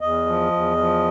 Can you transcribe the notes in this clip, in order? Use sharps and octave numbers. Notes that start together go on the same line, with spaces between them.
E2 D#5
F3
E2
F3